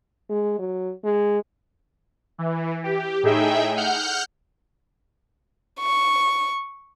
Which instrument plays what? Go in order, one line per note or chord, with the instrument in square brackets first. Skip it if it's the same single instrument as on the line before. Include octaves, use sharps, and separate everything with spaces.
[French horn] G#3
F#3
G#3
[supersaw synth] E3
G4
A2 D#4 G#4 E5 G5
F#5 F6 G6
[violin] C#6